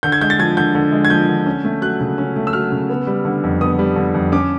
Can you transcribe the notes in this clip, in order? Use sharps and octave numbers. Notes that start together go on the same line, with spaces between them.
D3 G6
G#6
G#3 G6
A6
F3 G#6
D3 G6
D3
G#3
G#6
F3 G6
D3
C#4
A3
F#3 F#6
C#3
C#4
A3
E6
F#3 F6
C#3
B3
G3
D3
F2
B3 D#6
G3
D3
F2
C#4 D6